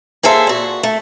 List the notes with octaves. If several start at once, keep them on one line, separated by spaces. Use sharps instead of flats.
A#3 G#4 A4 C5 E5
A#2 F#4
A3